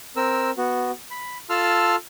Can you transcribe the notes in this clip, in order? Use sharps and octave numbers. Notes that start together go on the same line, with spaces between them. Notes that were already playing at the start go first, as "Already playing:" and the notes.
C4 A#4 E6
B3 F#4
B5
F4 A4 A5 C6 E6 F6